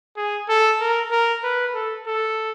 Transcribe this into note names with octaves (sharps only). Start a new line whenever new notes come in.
G#4
A4
A#4
A#4
B4
A4
A4